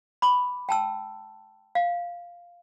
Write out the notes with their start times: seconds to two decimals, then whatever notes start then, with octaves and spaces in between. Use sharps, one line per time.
0.22 B5 D6
0.69 G5 A5 E6
1.75 F5